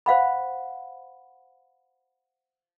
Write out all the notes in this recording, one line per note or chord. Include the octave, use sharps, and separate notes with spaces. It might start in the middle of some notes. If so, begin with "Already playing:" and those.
C5 F5 F#5 B5